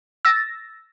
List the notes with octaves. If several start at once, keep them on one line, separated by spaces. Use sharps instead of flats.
E6 A6 A#6